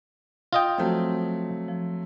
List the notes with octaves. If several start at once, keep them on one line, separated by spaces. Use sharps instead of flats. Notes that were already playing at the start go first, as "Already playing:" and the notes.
F4 D#5 F5 G5 D#6
F3 F#3 A3 C4 G6
F3